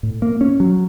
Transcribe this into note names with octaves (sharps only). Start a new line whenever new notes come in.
A2
A#3
C#4
F#3